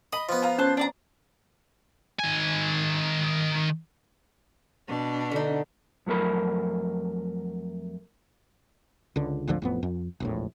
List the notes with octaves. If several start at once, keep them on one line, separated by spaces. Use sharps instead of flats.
D#5 B5 D#6
F3 B3
F4 A#5
C#4 C5 A5 F#6
D4 D5 A#5
D#3 G#5
B2 D4
D3 D#4
F2 F#3 A3 A#4 B5
C#2 D3
G#1 D2 D3 F3
A1 F2 B3
F2
E1 A#1 A2